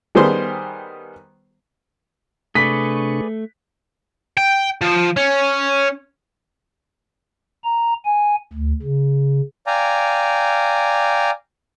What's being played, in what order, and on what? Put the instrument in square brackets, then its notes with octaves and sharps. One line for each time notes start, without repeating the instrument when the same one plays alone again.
[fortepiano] D#3 G3 B3 G#4 C5 C6
[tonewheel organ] C3 D4 C#6 [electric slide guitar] A3 [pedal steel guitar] G#4 B4 D5 [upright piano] B6
[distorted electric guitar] G5
F3
C#4
[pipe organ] A#5
G#5
D2
C#3
[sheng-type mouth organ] D5 F5 G5 G#5 A#5